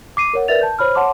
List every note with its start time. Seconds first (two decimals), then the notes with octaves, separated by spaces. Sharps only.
0.17 D6 C7 D#7
0.34 A#4 C#5 F#5
0.48 A#4 B4 D5 E5 A6 F7
0.61 A5 G6
0.79 C5 C#5 B5 F6
0.95 C#5 F#5 A5 C6 D6